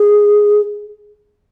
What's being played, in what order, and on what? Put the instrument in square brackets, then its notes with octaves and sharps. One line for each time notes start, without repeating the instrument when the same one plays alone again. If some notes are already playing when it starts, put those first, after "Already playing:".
Already playing: [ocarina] G#4